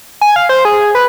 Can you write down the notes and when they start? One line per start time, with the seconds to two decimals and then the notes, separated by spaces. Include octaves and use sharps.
0.21 G#5
0.36 F5
0.49 C5
0.65 G#4
0.95 B4